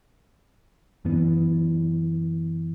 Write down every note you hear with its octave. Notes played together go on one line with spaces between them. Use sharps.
F#2 E3 B3